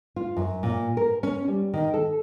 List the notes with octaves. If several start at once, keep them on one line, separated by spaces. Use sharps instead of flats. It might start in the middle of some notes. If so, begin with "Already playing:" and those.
F4
F#2
A#2
A#4
C#4
G3
D#3
A4